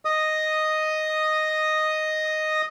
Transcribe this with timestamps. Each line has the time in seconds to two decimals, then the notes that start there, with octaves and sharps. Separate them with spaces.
0.05 D#5 D#6